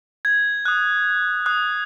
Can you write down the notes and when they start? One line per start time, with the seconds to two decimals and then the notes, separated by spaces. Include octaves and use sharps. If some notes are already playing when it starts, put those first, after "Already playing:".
0.25 G#6
0.66 D#6 F#6
1.46 D#6 F#6